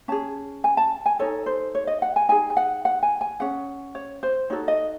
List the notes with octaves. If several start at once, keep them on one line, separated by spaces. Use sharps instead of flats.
C#4 G#4 A5
G#5
A5
G#5
D#4 A4 C#5
C5
C#5
D#5
F#5
G#5
D#4 G#4 G#5
G#5
F#5
F#5
G#5
G#5
C#4 G#4 F#5
C#5
C5
D#4 F#4 A4 C#5
D#5